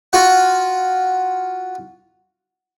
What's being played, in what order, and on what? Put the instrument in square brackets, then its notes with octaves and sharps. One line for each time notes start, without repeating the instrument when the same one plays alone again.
[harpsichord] F4 F#4 F#5